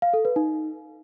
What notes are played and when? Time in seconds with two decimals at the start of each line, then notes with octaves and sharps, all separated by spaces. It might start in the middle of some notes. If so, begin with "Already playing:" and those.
0.02 F5
0.14 A4
0.25 B4
0.36 D#4